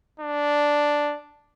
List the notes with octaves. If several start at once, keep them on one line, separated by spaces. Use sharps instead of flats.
D4